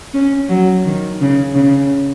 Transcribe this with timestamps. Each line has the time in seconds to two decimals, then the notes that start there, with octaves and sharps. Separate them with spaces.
0.14 C#4
0.49 F#3
0.85 D#3
1.21 C#3
1.55 C#3